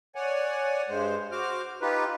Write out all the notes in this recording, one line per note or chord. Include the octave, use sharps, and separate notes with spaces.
C#5 D5 F#5 G#5
G2 G#3 C5
F#4 C5 D6 F6
D#4 F4 G4 B4